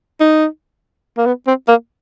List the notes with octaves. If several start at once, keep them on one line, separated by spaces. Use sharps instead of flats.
D#4
A#3
B3
C4
A#3